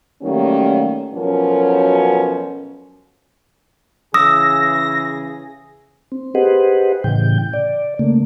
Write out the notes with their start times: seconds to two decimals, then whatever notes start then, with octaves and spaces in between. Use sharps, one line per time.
0.22 D#3 F#3 G3 A3 A#3 C#4
1.14 B2 F3 F#3 C#4 A4 A#4
4.14 C#3 E3 G#4 D#6 E6 A#6
6.12 C4
6.35 G4 G#4 B4 C5 D#5 F#5
7.04 A2 C#3 E3 G5 G6
7.53 D5
7.99 C#3 A3 A#3